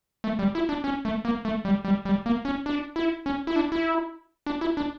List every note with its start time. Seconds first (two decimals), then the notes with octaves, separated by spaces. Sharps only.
0.24 A3
0.39 G3
0.55 E4
0.69 D4
0.84 C#4
1.05 A3
1.25 A#3
1.45 A3
1.65 G3
1.85 G3
2.05 G3
2.26 A#3
2.45 C#4
2.66 D4
2.96 E4
3.26 C#4
3.47 E4
3.56 D4
3.72 E4
4.46 D4
4.61 E4
4.77 D4